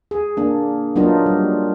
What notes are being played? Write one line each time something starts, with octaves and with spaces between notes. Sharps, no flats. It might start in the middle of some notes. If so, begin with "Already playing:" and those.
G#4
A#3 D4
F#3 A#3 B3 D4 D#4 F4
G3